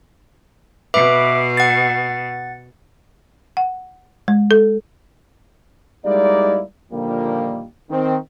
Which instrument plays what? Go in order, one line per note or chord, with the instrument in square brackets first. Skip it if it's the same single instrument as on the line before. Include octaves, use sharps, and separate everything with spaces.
[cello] B2 [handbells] B4 E5 D6
[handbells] F#5 A6
[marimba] F#5
G#3
A4
[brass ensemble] G3 G#3 A#3 D#4 E4 D5
A#2 D3 D#3 F3 G3 A#3
D#3 C4